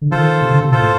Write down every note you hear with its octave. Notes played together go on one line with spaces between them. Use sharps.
D3
D#3 F4 A4 C5
C3
D3
C3
A#2 F4 A4 C5
A2